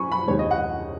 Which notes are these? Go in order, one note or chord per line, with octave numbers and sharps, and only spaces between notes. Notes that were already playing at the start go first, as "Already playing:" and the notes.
Already playing: F#2 G#5 B5 C#6
B5
D#2 D#3 G#3 C#5
D#5
F#5